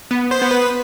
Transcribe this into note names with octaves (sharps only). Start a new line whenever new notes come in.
B3
C5
B3
B4